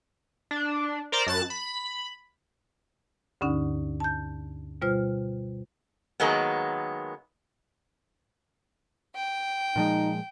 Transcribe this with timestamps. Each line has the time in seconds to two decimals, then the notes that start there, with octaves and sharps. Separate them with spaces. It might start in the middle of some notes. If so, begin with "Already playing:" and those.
0.51 D4
1.12 A#4 C5 D5 A#5
1.27 F#2 A5 F#6 A6
1.50 B5
3.41 D2 G2 D3 C#4 D#4 F#5
4.00 A5 G6
4.82 B2 G3 F4 C5 F6
6.20 D#3 F#3 G#3 A#3 B3
9.14 G5
9.76 A#2 F3 G#3 D#4